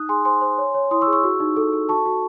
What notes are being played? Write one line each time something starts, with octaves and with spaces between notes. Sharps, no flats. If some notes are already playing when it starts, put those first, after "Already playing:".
Already playing: D#4 D#6 F#6
G#4 G#5 C6
C5 G#5 C6
C5
C#5
C#5
E4 C6 D#6
C#6 E6
G#4
C#6 E6
F#4
D#4
A4
A4
F#4 A5 C#6
F#4